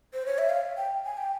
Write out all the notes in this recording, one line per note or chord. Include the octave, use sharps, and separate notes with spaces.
C5
C#5
E5
F5
G5
G#5
G5